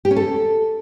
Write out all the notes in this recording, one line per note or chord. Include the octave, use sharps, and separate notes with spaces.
G4
C#4
A4